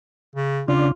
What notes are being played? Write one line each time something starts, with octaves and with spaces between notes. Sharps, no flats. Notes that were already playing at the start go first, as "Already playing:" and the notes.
C#3
C#3 D4 F4